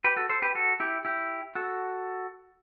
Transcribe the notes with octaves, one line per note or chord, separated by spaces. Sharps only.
G4 B4
F#4 A4
A4 C5
G4 B4
F#4 A4
E4 G4
E4 G4
F#4 A4